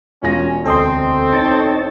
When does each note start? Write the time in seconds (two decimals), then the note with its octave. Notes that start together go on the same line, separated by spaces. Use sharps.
0.23 E1 C#4 F4 A#6
0.66 D2 C4 A4 D#5 C6
1.33 D#4 C#5 A5